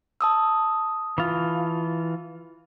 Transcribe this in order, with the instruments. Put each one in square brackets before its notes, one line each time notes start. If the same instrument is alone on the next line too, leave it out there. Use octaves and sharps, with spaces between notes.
[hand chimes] A5 D#6 E6
[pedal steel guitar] E3 F4